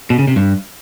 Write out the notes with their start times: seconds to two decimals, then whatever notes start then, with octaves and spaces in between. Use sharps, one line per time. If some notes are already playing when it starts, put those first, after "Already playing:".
0.10 B2
0.19 C#3
0.28 C3
0.36 G2